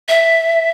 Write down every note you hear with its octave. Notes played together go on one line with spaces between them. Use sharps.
E5